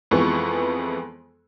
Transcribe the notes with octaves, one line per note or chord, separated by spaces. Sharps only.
F2 E3 G#3 B3 C#6